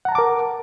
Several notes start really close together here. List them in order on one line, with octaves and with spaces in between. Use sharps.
F#5 A#5 A5 D6 A#4